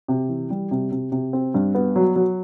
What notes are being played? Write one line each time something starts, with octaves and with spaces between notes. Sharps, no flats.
C3
E3
G3
C3
C3
C3
C4
G2
B3
F#3
F#3